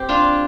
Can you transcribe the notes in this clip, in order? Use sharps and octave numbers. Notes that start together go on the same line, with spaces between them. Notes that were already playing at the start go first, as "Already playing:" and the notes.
Already playing: C4 G4
D4 F4